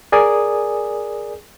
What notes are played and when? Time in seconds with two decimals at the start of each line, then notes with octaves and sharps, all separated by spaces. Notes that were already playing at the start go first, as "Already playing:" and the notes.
0.12 G#4 A#4 D5 G#5 D#6